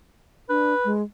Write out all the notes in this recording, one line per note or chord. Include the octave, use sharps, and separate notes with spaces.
D4 B4
G#3